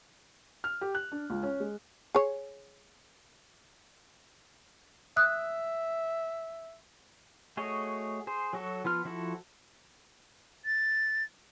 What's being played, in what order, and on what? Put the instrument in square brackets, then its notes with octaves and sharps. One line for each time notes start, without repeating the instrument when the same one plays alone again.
[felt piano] F6
G4
F#6
D4
C#2
C#4
G#3
[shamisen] G#4 C#5
[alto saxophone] E5 [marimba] D#6 F#6
[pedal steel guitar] A3 F#4 G#4 C#5 D#5
G#4 C5
F#3 F#4 A4
F3 B3 F4 F6
F3 E4 F#4 A4
[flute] A6